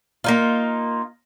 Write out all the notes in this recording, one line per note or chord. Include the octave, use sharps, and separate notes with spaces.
A#3 D#4 F4